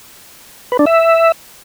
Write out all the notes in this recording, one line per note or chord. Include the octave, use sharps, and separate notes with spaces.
B4
D4
E5